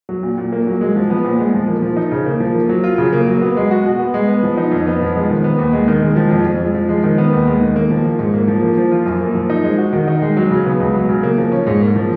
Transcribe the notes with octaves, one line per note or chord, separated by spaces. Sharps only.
F#3
A#2
A#2
A#3
F#3
G#3
F3
B3
A#2
G#3
F3
A#3
F3
D#4
C#3
A#3
F3
A#3
F#3
F4
C#3
A#3
F#3
B3
G#3
F#4
B2
B3
G#3
B3
F3
D#4
F2
B3
F3
G#3
D#3
B3
D#2
G#3
D#3
G#3
F3
F2
F2
G#3
F3
G#3
D#3
B3
D#2
G#3
D#3
A#3
F3
F4
G#2
A#3
F3
A#3
F3
F4
F#2
A#3
F3
D#4
G#3
F#4
D#3
D#4
G#3
F#3
C#3
B3
C#2
F#3
C#3
A#3
F3
C#4
G#2
A#3
F3